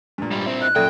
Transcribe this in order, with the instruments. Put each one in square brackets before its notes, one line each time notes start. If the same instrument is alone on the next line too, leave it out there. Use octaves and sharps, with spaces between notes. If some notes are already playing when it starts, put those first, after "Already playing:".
[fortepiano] G2 A#2
[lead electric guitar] G#2 G3
C4 E4
[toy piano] D#5 [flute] F#6
[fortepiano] F#2 A#2 [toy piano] A4 D5 E5 [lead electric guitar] G5